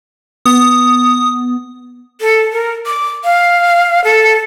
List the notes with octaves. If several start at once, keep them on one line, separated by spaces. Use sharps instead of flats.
B3 D#6
A4
A#4
D6
F5
A4